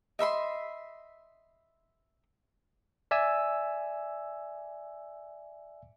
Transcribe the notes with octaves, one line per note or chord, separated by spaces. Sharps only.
D#5 E5 B5 C6
D5 E5 G#5 E6